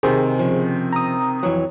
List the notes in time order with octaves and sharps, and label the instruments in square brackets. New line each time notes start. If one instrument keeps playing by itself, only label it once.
[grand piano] C3 D#3 [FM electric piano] G#4 C5
[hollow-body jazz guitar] C#3 F3
[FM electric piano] A#5 D#6
[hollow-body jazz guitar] F2 E3 F#3